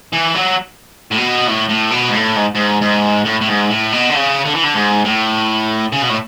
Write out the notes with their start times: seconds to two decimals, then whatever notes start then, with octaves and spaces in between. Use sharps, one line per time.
0.13 E3
0.35 F#3
1.11 A2
1.18 B2
1.47 A2
1.69 A2
1.91 B2
2.08 G#2
2.14 A2
2.36 G#2
2.55 G#2
2.81 G#2
3.25 A2
3.41 A2
3.48 G#2
3.70 A2
3.93 B2
4.10 D3
4.15 C#3
4.45 D3
4.54 E3
4.63 D3
4.74 G#2
5.04 A2
5.93 C#3
6.02 B2
6.09 A2